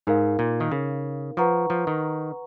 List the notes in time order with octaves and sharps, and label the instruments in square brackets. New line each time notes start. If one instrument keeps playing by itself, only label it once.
[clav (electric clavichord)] G#2 [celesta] D#4 A#4 F5
[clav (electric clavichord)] A#2
D#3
C#3
[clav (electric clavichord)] F3 [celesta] B4 F#5 A#5 C#6
[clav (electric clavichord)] F3
D#3